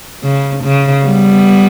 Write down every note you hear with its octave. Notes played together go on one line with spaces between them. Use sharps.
C#3
C#3
G3 B3